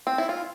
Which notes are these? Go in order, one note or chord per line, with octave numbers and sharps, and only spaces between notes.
C4
E4
F4